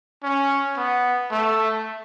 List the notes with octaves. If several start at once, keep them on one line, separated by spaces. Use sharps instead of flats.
C#4
B3
A3